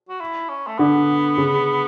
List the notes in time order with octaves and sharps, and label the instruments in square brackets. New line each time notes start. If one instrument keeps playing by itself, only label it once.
[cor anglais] F#4
E4
C#4
A3
[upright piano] D3 [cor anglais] B3
[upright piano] C#3